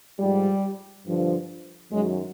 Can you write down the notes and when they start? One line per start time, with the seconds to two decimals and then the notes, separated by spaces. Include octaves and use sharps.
0.20 G#2 F3 G3
1.06 G2 D3 F3
1.91 F#2 D#3 F#3 G#3